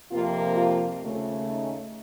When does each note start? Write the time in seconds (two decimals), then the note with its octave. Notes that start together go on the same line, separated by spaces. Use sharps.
0.11 F2 C3 F3 A#3 F4
0.57 F4
1.02 D#2 C#3 A3
1.48 D#4